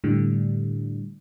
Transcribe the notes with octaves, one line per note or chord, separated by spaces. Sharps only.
A2 D3 G3